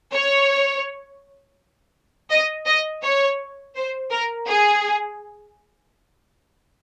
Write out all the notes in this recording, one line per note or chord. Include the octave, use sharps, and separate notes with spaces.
C#5
D#5
D#5
C#5
C5
A#4
G#4